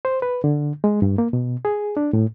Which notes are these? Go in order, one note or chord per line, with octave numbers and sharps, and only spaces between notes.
C5
B4
D3
G#3
G2
A#3
B2
G#4
D4
A2